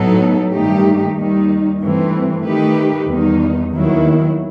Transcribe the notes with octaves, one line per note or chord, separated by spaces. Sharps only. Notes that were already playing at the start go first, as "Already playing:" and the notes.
Already playing: A2 F#3 B3 D#4 A4
G2 D#3 A3 D#4 G4
D#2 D#3 G3 D#4
G2 E3 A3 C4
D#3 A3 D#4 G4 B4
E2 D#3 G3 D#4
D#2 D#3 F#3 B3 E4